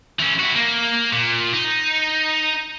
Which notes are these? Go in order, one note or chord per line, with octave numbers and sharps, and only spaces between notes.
E3 C#4
E4 F#4
A#3
A#2
D#4